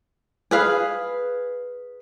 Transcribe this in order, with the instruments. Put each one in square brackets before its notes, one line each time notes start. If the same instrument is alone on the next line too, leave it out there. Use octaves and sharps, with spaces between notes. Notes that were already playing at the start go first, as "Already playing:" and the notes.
[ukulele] G#4 B4 F5